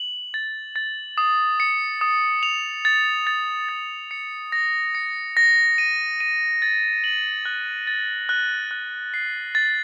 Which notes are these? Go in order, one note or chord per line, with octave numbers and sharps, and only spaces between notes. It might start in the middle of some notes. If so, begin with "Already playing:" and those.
Already playing: F#7
A6
A6
D#6
C#7
D#6
F7
A6
A6
A6
C#7
A#6
C#7
A#6
D#7
D#7
A6
F#7
F#6
A6
F#6
F#6
C7
A6